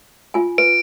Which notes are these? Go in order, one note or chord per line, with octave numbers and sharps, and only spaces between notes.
F4 G#5
B4 D7